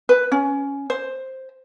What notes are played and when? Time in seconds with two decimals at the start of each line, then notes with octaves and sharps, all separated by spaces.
0.09 B4
0.32 C#4
0.90 C5